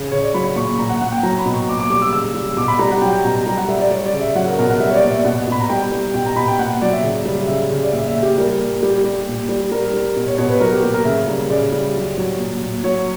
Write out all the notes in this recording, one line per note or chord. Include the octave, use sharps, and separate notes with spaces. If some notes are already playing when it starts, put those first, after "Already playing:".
Already playing: C#3
C#3 C#5
D5
F#3 B5
A#2 C#6
A#2 A#5
F#5
A#2 F#5
G5
F#3 A#5
B5
B2
C#6
A#2 D6
D6
G3 D6
E6
C#3 E6
G3
B2 D6
B5
G3 A#5
F#5
F#3 G5
G5
B2 A#5
A#5
G3 A#5
F#5
G3 E5
D5
G3 C#5
D5
C#3
E5
F#3 F#5
A#4
B2 A#4
F#5
G3 E5
C#5
D5
A#2
E5
B2 F#5
B2 B5
A#5
G3 G5
G3
B2 G5
A#5
B2 B5
G5
A#2 F#5
F#3 D5
E5
C#3
G3
C#3 E5
C#3
D5
A#2 E5
E5
A#2
G4
G3 A#4
A#2
G3 G4
G3
A#2
G3
G3 A#4
G3
B2
C#5
B2 C#5
B4
F#3 A#4
G4
A#2 G4
A#4
C#3 E5
G3
C#3 D5
G3
F#3
F#3
A#2
A#2
F#3 C#5